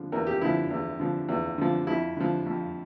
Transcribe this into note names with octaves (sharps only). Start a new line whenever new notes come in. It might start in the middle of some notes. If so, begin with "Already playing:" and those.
Already playing: D3 F3
E2 A#4
G4
D3 F3 E4
E2
D3 F3
E2
D3 F3
F2 E4
D3 F3
F2